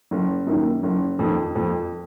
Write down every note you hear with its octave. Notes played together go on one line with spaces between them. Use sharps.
F#1
F#2 D#3 A#3
F#1
F2 D#3
F2